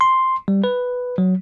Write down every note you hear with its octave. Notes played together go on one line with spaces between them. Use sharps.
C6
G3
B4
F#3